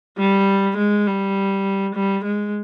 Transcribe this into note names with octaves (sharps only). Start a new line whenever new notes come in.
G3
G#3
G3
G3
G#3